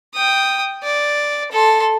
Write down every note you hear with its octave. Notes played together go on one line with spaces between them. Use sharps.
G5 D#6
D5
A4 C6